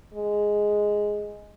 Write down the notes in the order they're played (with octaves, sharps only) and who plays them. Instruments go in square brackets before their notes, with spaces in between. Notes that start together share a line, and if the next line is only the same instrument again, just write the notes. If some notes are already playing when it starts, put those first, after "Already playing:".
[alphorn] G#3